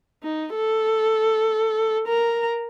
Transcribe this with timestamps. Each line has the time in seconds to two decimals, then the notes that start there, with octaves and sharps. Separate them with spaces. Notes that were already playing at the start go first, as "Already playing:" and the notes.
0.23 D#4
0.55 A4
2.07 A#4 A#5